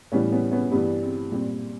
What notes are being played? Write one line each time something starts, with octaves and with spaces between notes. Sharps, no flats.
A2 E3 G3 B3 C#4
B3 C#4
B3 C#4
G2 E3 G3 B3
C4
A#2 G3 C4